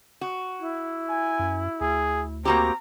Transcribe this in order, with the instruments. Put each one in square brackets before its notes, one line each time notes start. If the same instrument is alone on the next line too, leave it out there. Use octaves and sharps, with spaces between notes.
[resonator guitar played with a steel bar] F#4
[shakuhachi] E4
[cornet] G#5
[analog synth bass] F#2
[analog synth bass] D2 [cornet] G#4
[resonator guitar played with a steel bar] A#3 F#4 G4 [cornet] C4 [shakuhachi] A#5